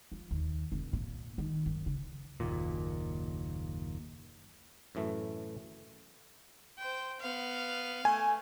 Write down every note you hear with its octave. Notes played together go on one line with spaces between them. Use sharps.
F3
D#2
F1
A#2
D#3
F#2
C#3
F#1 D#2 A#2
F#2 A2 E3 A3
C5 G5
B3 F5
A3 G#5